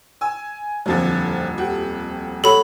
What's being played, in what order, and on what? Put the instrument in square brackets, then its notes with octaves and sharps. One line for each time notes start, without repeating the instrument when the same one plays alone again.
[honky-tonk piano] G#5 E6
[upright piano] D#1 F2 A6 [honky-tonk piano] D3 F3 F#3
[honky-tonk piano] F#4 G4
[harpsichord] F#3 [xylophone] A4 B5